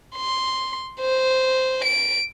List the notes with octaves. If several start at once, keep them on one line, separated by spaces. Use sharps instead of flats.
C6
C5
D7